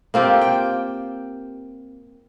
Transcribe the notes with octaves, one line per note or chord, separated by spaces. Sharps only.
A#3 C4 F4 G4
G5